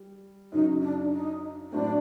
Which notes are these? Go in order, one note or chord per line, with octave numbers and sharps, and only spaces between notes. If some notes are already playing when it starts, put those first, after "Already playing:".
Already playing: G3
F#2 C#3 F#3 D#4
D4
D#4
A2 F#3 A3 C4 D4